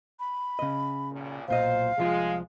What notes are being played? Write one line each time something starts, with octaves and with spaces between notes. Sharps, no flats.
B5
C#3 D#5
B1 A#2
B1 A#2 C5 D#5 F5
C2 F3 G#3 F4